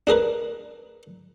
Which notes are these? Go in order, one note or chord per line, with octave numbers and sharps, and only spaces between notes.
D4 G#4 A#4 B4